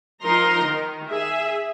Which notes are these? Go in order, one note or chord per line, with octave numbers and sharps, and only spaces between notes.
F3 D#4 A#4 A#5 C6
D#3
G#4 E5